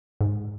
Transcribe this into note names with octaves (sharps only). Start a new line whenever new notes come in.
G#2